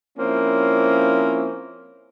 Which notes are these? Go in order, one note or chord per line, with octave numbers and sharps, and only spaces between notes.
F3 A#3 C4 C#4 E4